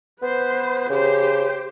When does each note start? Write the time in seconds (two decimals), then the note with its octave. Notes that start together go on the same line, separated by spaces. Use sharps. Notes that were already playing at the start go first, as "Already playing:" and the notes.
0.22 B3 B4 C5
0.90 C#3 G4 C5